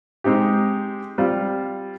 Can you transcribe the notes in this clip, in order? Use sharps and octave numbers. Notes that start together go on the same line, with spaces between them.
G#3 C4 D#4 G4
G3 C4 F4